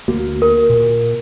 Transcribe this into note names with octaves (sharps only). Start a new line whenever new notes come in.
D2 A#3 F#4
A#4
A#2